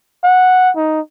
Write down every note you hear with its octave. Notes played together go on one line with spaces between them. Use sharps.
F#5
D#4